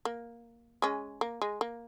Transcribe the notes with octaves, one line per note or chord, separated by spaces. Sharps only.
A#3
G#3 C#4
A#3
G#3
A#3